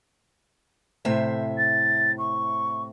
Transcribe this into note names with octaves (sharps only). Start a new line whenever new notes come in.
A2 C3 C5 E5
A6
C#6